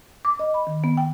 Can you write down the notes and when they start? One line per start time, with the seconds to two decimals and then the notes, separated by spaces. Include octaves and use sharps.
0.25 D6
0.39 D#5
0.54 B5
0.67 D#3
0.84 B3
0.97 G5